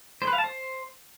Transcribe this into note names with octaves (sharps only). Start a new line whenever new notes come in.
C5
B4
F5
A5
C5